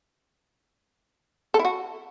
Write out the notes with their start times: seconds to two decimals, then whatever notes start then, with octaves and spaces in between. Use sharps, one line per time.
1.54 A4
1.59 E4
1.65 F#4